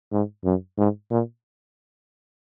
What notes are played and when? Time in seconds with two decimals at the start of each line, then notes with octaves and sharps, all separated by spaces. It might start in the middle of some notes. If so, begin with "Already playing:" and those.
0.12 G#2
0.44 F#2
0.78 G#2
1.11 A#2